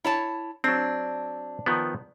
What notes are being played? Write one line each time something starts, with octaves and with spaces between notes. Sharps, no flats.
E4 C#5 A5
F#3 C4 D4
D#3 F3 B3